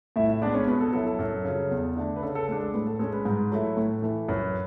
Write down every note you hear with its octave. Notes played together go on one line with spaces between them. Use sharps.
A2 E4 E5
E4 E5
G#3 B3 D4 D5
C#4 C#5
B2 B4
A4
F#3 B3 E4 A4
A4
F#2
C#3
F#3
E2
D3 A3 D4
B4
C#3 A4
A4
G#3 D4 A4
A4
A2 B4
A4
G#3 C#4 A4
B4
G#2
F#3 A3 E4
A2
E3 A3
F#2 B4